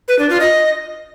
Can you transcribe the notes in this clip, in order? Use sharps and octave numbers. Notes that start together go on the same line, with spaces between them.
B4
D4
F4
D#5